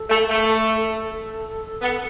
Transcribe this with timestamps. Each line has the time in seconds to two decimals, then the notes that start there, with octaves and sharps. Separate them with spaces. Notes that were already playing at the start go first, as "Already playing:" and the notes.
Already playing: A4
0.10 A3
0.29 A3
1.82 B3